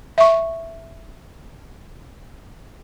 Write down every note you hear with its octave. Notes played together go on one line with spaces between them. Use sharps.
E5 C#6